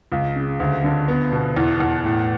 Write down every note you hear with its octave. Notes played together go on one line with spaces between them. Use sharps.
C#2
C#3
D2
D3
B3
B2
E2
E2
A2